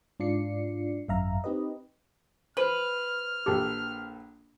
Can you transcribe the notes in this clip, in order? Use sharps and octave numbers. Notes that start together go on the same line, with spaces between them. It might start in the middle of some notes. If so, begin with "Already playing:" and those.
G#2 D4 F4 D5 C7 C#7
G#1 F#2 E5 F5 A#5
C4 D#4 G4 B4 D#5
B4 C5 F6
A#1 G4 A4 G5